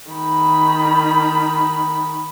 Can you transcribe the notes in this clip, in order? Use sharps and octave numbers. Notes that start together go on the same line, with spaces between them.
D#3 B5